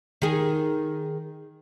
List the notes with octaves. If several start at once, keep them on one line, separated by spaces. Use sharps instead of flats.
D#3 G#4